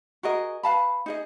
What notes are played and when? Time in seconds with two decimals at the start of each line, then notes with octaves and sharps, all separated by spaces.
0.23 F#4 G#4 A#4 D#5
0.63 B4 F5 A5 B5
1.06 D#4 G#4 D#5